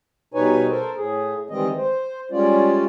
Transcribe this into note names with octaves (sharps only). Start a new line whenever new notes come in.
B2 G3 D#4 B4 C#5 G#5
A4 A#4 C5
A2 G#4
D#3 E3 G3 G#3 C4 D#5
C5
G3 G#3 C#4 F4 D5